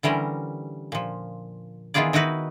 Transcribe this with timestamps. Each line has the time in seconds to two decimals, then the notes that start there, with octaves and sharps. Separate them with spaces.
0.03 D3 E3 G3 C#4 A#4
0.92 A#2 F3
1.94 D#3 E3 B3 F4 G#4 D5
2.13 D#3 D#4 E4 F#4 B4